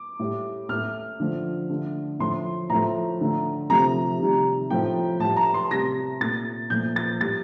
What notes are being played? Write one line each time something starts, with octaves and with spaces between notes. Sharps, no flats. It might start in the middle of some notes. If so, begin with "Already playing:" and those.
Already playing: D6
A2 G3
A2 A3 F6
D3 F3 A3
D3 A3
A2 F3 A3 C6
A2 F3 A3 A#5
D3 A3
C3 F3 A3 A#5
C3 D#3 G3
A2 F3 A3 G5
A2 G3 A5
A#5
C6
C3 G3 A#6
A#2 A3 A6
A#2 F3 A3 G6
A6
A2 G3 A6